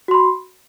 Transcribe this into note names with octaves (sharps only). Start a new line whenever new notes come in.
F#4 B5 C6